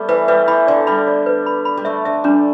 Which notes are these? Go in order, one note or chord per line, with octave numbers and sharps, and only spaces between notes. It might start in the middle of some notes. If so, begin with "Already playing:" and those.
Already playing: G3 A3 B3
E3 B4
G3 B4
E3 B5
D3 D5
G3 B5
D5
B4
B5
B5
G3
A3 E5
D3 E5
G3 D4